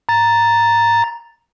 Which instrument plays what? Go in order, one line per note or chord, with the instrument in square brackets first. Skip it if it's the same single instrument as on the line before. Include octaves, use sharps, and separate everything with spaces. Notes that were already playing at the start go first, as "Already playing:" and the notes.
[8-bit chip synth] A#5 A6